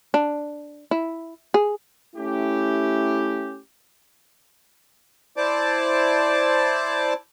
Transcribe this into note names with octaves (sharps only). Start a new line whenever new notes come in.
D4
E4
G#4
A3 C#4 E4 G4
E4 C5 D5 A5 D6